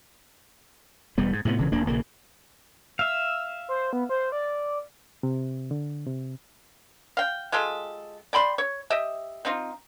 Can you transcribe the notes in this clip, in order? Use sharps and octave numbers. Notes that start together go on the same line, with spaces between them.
E1 G3 B3
G#2
A2 C3 E3 B3
E1 C#3 E3
D1 A#3 D4
A#1 C#3 A#3
E5 F5 E6
C5
B3
C5
D5
C3
D3
C3
F5 G5
G#3 F4 G4 A4
D5 G5 B5 C6
C#5
G4 D#5 E5
C4 D#4 F4